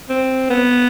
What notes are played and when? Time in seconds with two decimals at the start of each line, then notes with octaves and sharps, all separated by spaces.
0.09 C4
0.50 B3